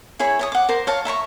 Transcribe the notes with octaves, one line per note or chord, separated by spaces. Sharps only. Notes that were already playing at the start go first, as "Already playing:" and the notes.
E4 G#4 C#5 B5
C#5 A5 D#6
F#5 D6
A#4 C5
C#5 F5 A5
E5 A#5 B5 C#6